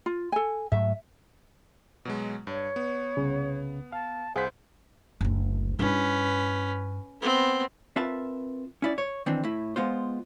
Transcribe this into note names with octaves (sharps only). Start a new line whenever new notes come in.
F4
A4 G#5
G#2 F#3 A3 E5
B2 F#3 G#3
G2 C#5
B3
C2 C#3
F5 A5
C2 G#4 C5 F5 F#5 B6
F#1 D2
G2 C#4 E4 B4
B3 C4
C4 F4 A#4 B4 E5 A5
C#4 E4 D5
C#5
D#3 E3 C4 D4
A2 E4
G#3 B3 F4 C5